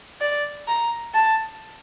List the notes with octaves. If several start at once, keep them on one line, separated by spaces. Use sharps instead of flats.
D5
A#5
A5